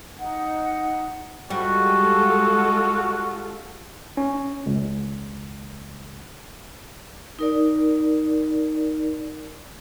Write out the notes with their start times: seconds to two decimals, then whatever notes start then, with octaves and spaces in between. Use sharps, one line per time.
0.19 D#4 F#5
1.50 G3 G#3 F4 F#4 A4
4.17 C#4
4.66 C#2
7.39 D#4 A#4 D5